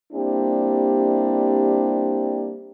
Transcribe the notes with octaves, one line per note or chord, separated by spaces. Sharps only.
G3 A#3 C4 D4 E4 G4